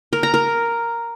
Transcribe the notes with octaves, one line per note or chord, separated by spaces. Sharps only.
A#4
A#5
A#4